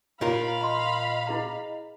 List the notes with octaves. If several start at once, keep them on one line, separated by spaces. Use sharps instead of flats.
A#2 F4 A#4 C#5 F5 B5
D#5 A#5 C6
E4 G#4 A#5